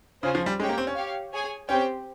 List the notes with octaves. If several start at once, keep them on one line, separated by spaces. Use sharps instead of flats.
C#3 C#4 F4 G#4 C5
F3
G3
G#3 C#4 G4 C#5 G5
A#3
C4
C#4
G4 C#5 F5
G#4 C#5 G#5
C4 C#4 G4 C5 G5